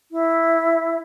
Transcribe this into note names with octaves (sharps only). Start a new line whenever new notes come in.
E4